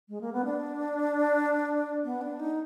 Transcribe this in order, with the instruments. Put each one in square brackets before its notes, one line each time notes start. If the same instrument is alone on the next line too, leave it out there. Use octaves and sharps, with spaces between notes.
[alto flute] G#3
A#3
B3
D4
B3
D4
D#4